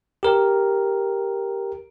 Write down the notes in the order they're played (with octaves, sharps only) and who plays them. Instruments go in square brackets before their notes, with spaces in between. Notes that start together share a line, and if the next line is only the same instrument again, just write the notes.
[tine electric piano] G4 A#4